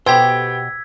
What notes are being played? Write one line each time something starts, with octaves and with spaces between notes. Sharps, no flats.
B2 B3 G4 C5 G5 E6 G#6 B6